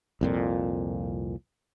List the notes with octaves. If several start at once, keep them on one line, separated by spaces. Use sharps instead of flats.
C2 F2 A#2